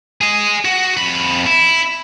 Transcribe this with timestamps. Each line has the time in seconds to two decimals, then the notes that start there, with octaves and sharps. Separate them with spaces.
0.21 G#4 D#5
0.65 F#4
0.97 F2 B5
1.47 E4